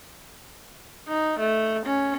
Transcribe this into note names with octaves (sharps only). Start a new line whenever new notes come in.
D#4
A3
C#4